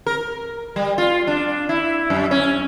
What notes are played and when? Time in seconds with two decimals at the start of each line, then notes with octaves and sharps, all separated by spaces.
0.06 A#4
0.76 G3
0.98 F4
1.27 D4
1.69 E4
2.10 F#2
2.31 C#4